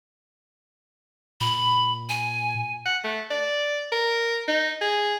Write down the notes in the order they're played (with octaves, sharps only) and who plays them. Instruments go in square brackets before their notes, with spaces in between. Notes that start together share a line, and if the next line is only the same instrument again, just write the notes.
[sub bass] A#2 [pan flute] B5
[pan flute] G#5
[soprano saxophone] F#5
A3
D5
A#4
D#4
G#4